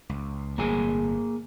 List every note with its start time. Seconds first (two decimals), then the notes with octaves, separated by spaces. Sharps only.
0.09 C#2
0.58 G1 A2 C3 A#3 G#4 G#5